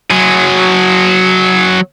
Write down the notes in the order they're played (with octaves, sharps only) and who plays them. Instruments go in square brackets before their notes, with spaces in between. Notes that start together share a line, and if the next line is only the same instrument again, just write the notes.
[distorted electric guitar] F#3 G#4